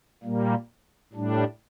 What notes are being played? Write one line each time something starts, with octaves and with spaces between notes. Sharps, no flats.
A#2 G3 A#3
A2 G3 D4